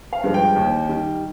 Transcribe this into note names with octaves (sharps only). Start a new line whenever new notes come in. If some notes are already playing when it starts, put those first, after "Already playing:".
F5
G2 F3 G#3
G5
D#2
D#3 G3